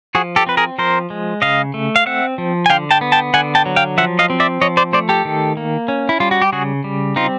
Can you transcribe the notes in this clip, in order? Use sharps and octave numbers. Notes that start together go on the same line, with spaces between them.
F3 F#4 G#4
G4 A4
C4 B4
G#4 A#4
F3 A#4 C5
G#3
C#3 D#5 F5
A3
F5
C4 E5 F#5
F3
G#5
D3 F5 G5
G5 A5
B3
G5 A5
D3 F#5 G#5
G5 A5
F#3
F5 G5
F3 E5 F#5
D#5 F5
C4
D5 E5
F3 C#5 D#5
C5 D5
A3 C5 D5
G4 A4
D#3
A#3
C#4
E4
G3 F4
F#4
G4
C#3 F#4 G#4
G3
C4 D#4 F4